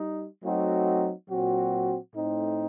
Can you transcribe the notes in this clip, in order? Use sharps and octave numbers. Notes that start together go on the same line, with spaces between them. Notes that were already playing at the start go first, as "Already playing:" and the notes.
Already playing: G3 D#4
F#3 A3 C4 D#4 F#4
A#2 F#3 C4 F#4
A2 A3 C4 D#4